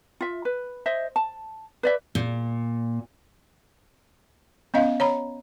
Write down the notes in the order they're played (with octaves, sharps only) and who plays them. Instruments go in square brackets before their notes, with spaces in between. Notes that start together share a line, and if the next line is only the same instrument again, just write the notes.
[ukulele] F4 E5
B4
C5 D#5 E5
A5
B4 D5 E5
[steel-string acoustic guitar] A#2
[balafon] B3 C#4 D#5 F5
C#5 A#5 B5